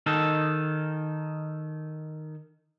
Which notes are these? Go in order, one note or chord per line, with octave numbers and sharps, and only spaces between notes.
D#3 D#4 A4